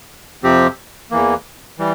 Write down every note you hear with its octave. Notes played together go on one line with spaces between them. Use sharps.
F2 C3 F3 C4 G4
E2 E3 A#3
E3 G3